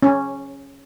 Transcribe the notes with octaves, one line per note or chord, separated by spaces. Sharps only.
C#4